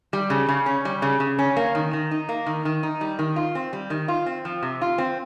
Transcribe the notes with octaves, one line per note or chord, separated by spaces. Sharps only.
G3
C#3
C#3
C#4
G3
C#3
C#3
C#4
A#3
D#3
D#3
D#4
A#3
D#3
D#3
D#4
G3
D#3
F4
C4
G3
D#3
F4
C4
F3
C3
F4
C4